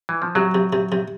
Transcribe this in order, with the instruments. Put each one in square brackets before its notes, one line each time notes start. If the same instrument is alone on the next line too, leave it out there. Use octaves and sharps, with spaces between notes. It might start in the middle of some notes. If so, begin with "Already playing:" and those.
[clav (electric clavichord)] E3
F3
[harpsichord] C3 [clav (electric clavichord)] F#3
[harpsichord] C3
C3
C3